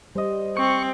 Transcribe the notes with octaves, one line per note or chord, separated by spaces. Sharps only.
G3 C5 D#5
C4 C#6